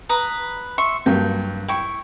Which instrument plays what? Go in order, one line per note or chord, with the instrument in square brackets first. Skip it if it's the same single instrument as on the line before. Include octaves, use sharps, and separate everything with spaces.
[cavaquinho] B4 A#5 D#6
E5 C6 C#6
[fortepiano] G2 F#3 A#3 [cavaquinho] G5
[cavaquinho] E4 C#6 [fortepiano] G5